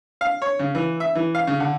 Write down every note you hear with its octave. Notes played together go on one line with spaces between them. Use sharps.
F5
C#5
C#3
E3
E5
E3
F5
C#3
D3